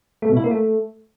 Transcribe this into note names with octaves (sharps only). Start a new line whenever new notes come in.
A3
B2
E4
A#3
A3